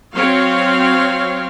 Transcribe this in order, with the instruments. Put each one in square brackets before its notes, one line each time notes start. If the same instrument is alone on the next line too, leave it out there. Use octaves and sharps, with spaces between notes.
[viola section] F#3 C4 C#5 F5